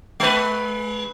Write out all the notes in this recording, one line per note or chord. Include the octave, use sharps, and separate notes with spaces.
G#3 B4